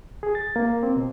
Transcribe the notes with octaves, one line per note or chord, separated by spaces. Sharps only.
G#4
A6
A#3
C4
B2